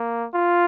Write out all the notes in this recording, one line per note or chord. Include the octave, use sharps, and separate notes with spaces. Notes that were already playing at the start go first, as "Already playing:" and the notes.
Already playing: A#3
F4